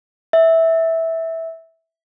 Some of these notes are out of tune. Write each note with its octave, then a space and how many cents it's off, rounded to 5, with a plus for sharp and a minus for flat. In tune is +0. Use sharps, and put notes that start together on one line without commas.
E5 -15